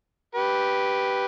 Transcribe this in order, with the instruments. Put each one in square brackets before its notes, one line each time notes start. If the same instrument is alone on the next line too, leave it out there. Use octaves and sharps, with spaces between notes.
[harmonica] G4 B4